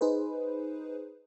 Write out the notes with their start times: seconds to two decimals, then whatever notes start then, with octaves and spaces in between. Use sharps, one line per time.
0.01 D#4 G#4 B4 C5